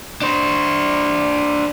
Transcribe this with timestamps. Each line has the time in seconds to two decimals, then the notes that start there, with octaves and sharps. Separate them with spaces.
0.22 D4 C5